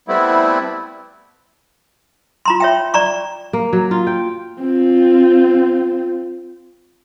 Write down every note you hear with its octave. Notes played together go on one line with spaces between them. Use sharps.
G3 A3 B3 C4 E4
F4 A#5 C6
C#5 E5 G5
D5 A#5 C#6
A#3
F#3
F4
G5
C4 F4